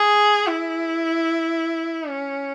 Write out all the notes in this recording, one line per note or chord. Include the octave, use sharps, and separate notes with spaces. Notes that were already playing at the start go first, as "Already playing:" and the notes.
Already playing: G#4
E4
C#4